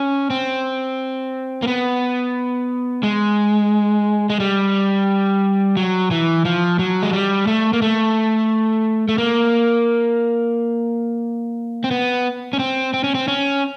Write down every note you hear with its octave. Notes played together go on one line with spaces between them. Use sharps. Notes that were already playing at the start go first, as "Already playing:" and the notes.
Already playing: C#4
C4
A#3
B3
G#3
G#3
G3
F#3
E3
F3
F#3
G#3
G3
A3
A#3
A3
A3
A#3
C4
B3
C#4
C4
C4
C#4
C4
C#4